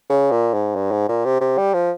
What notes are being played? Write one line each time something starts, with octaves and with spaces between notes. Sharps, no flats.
C#3
A#2
G#2
G2
G#2
A#2
C3
C3
G3
F3